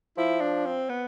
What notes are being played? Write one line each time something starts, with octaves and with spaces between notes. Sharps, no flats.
F3 E4
D4
C4
B3